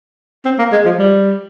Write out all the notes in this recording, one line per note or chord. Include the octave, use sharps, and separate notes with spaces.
C4
A#3
G#3
F3
G3